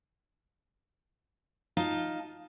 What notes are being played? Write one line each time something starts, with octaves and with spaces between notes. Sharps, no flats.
D#4 F4 A5